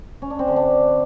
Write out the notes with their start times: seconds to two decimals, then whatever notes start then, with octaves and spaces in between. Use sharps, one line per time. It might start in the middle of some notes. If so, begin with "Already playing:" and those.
0.22 C#4
0.30 D4
0.39 C4
0.48 D3
0.56 D4